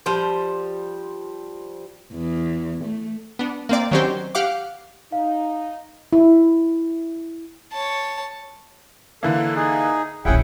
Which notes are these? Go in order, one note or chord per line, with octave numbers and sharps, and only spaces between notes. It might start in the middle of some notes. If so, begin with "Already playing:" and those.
F3 G3 C5
E2
A3
B3 D4
A#3 C4 D5
D#3 F#3 C4 C#4 G4 C5
G4 F5 F#5 D6
D#4 F5
E4
C#5 A5
D3 E3 A#3 A4
D#4 G#4
D#1 A#1 C#4 E4 G#4 F#5 G5